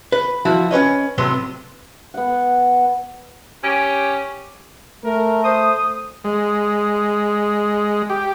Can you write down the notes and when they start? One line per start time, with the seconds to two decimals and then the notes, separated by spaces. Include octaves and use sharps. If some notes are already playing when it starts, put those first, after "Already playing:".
0.12 B4
0.45 F3 E4 F#4
0.71 C#4 B4 C#5 D#5
1.18 A2 C3 F#3 B3 C6
2.14 B3 F#5
3.64 C#4 G4
5.05 A3 A#4
5.44 C5 D#6
6.24 G#3
8.10 G4